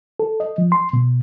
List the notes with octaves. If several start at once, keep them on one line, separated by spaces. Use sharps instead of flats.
A4
D#5
F3
C6
B2